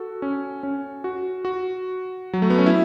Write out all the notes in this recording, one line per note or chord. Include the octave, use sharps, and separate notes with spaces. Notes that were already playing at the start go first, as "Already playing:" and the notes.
Already playing: F#4 A4
C#4
C#4
F#4
F#4
F#3
A3
B3
C#4
E4